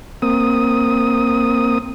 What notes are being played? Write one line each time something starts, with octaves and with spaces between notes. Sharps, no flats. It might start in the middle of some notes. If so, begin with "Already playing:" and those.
A#3 C4 D#6